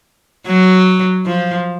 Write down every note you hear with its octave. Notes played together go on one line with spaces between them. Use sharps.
F#3
F3